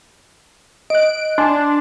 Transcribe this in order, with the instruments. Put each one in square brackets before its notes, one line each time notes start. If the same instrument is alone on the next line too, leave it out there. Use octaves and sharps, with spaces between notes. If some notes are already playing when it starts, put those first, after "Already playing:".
[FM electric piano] D#5 F#6 [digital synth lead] D7
[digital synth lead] D4 [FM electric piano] G#5 C6